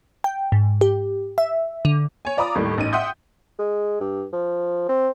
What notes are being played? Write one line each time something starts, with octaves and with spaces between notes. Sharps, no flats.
G5
G#2
G4
E5
D3
C#5 G#5
F4 D5 A#5 B5 D6 D#6
D#2 A2 G3
A1 D#4 D#7
E5 F#5 G5 C6 D#6 G6
G#3
G2
F3
C4